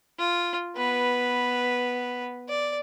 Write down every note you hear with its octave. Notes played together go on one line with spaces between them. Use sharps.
F4
B3 B4
D5